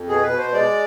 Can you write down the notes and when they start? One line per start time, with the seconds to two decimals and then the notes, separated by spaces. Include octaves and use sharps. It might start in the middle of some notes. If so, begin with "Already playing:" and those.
Already playing: F2
0.09 B2 G#4
0.23 B4
0.31 B2
0.38 C5
0.53 G#3 D5